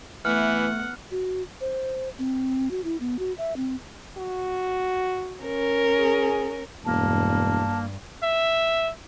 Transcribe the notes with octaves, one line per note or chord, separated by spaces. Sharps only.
E3 A3 B3 F#5 F6
F#4
C5
C4
F#4
E4
B3
F#4
E5
C4
F#4
C#4 A#4
G#4
E1 G2 A#3 A5
E5